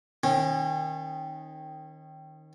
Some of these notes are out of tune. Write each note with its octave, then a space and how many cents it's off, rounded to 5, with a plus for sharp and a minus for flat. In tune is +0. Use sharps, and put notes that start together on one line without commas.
D#3 +0 C#4 -35